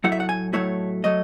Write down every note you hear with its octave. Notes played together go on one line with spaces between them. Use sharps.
A2 F#3 A3 E4 F#5
E5
F#5
G#5
A2 F#3 A3 E4 C#5
F#3 A3 D#5